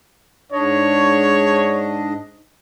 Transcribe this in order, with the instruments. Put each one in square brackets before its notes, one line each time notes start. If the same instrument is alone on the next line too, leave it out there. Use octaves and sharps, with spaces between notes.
[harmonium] G#2 D4 D#5 [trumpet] C#5